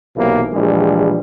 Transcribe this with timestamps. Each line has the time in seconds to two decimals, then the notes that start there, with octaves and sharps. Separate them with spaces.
0.16 B1 C3 E3 A#3
0.53 A#1 E3 G3 G#3